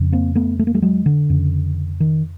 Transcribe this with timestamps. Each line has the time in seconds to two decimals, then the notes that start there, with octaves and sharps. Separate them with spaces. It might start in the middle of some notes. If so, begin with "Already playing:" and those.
Already playing: F2 C#3
0.12 A#3 C4
0.35 A3 B3
0.59 A3
0.67 A#3
0.74 G3 A3
0.82 F#3 G#3
1.06 D3
1.29 F2 C#3
2.00 D#3